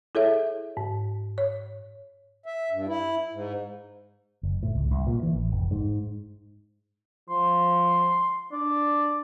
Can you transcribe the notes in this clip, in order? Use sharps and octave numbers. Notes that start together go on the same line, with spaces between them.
E4 G#4 A4 C#5 E5
G#2
C#5
E5
G2
E4
G#2
F#1
A2
C#2
C2
A#2
E3
A1
F1
G#2
F3 C6
D4 D5